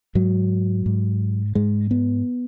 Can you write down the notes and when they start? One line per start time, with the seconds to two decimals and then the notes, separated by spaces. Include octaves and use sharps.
0.15 G#2 F#3
0.86 G#2
1.55 G#2 G#3
1.91 B3